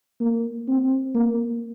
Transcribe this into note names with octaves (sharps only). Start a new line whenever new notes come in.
A#3
C4
A#3